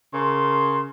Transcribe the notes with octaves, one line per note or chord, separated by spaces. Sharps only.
C#3 A#4 C6